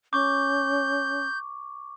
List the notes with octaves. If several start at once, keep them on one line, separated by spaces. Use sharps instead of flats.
C#4 C#6 D6 G6